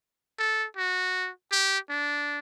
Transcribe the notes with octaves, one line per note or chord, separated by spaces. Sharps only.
A4
F#4
G4
D4